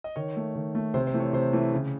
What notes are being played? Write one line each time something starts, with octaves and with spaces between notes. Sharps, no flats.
D#5
D#3 C#5
A3
D#3
A3
C3 C5
C5
E3 A3
C#5
C3 C5
E3 A3
C#3